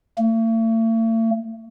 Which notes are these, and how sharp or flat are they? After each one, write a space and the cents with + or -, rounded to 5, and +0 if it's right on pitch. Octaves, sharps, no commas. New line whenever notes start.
A3 +45